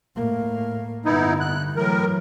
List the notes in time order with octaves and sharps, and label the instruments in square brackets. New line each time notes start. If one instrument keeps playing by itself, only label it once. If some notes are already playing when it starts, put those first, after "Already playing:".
[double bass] A2 A#3
[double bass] G2 D3 [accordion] B3 D#4 E4
[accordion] F#6
[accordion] A2 A#4 [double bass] E3 F#3